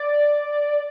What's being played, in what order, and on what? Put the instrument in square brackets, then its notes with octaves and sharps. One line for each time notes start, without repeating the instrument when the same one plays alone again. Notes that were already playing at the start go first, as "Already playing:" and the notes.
Already playing: [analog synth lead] D5